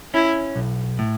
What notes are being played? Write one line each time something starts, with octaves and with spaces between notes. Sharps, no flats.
C#4 E4
B1
A2